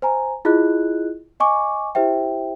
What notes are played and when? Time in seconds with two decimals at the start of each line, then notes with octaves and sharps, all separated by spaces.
0.02 C5 G#5 A#5
0.45 E4 F4 G#4 D#5 F#6
1.40 D#5 G#5 C#6 D6
1.95 E4 G4 C5 E5 G5